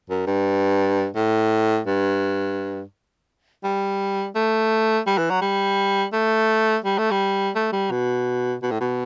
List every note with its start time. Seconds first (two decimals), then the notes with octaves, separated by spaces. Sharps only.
0.10 F#2
0.27 G2
1.16 A2
1.87 G2
3.64 G3
4.35 A3
5.07 G3
5.18 E3
5.30 F#3
5.41 G3
6.13 A3
6.84 G3
6.98 A3
7.11 G3
7.55 A3
7.72 G3
7.91 B2
8.63 B2
8.71 A2
8.81 B2